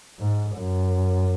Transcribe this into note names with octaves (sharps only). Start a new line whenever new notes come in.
G#2
F#2